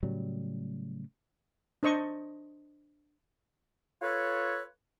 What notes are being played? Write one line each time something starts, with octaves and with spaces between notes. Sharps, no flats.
A2 C#3 F#3 G3
D4 C5 D#5 C#6
F4 A4 B4 C#5